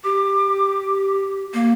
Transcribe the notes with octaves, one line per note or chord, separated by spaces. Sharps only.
G4 D6
A#3